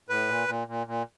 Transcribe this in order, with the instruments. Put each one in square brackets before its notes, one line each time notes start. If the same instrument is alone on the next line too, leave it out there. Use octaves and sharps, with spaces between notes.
[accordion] A2 B4
A#2
A#2
A#2
A#2